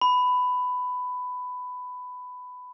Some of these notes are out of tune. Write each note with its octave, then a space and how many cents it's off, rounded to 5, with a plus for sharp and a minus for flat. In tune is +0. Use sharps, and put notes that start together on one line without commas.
B5 +15